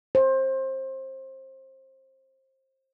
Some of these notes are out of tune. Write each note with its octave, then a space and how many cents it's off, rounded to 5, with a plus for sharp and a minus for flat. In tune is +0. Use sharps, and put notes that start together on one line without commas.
C5 +25